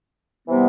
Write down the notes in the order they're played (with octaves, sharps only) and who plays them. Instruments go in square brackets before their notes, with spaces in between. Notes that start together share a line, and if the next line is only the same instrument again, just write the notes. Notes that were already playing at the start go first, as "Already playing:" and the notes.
[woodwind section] C3 E3 G3 B3